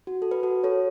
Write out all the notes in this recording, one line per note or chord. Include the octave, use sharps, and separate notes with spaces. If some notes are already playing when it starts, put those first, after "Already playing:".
F#4
A4
B4
F#4 A4
A4 C#5